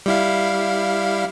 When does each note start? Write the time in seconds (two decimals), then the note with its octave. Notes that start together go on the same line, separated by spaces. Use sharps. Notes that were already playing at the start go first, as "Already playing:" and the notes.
0.06 G3 E4 F5